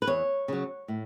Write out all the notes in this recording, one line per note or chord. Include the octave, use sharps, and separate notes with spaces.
B4
E2 C#5
C#3 F#3
A2